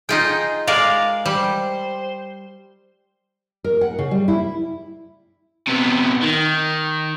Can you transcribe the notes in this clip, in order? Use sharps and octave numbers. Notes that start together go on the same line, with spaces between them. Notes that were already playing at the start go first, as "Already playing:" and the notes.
D#4 F4 G#4 G5
G#3 A#4 D5 F5
G3 C5
A#4
F#5
C#3
G3
E4
C3 B3
D#3